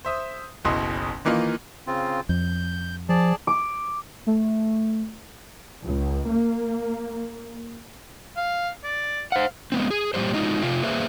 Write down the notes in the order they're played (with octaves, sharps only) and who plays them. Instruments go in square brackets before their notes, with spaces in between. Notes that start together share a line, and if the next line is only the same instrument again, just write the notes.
[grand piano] C5 E5 D#6
F#1 B1 B2 E4 C6 D#6
D#3 E3 A#3 D#4 F4
[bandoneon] C#3 C4 F4
[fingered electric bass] F2 [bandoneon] G6
[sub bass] F3 [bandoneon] G#4 D5 A5
[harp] D6
[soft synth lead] A3
[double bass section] C#2
A#3
[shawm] F5
D5
[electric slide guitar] C5 F#5 [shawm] F5
[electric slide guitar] G#3 B3 C4
G#4
A#2 D#3 G3 G4 C5
G#3 D#4 F4 F#4
C3 F4 E5 G5
A#3 G#4 B4 C5 E5